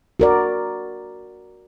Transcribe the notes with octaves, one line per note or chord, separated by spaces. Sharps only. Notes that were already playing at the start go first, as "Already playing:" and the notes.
F#4 A#4 D5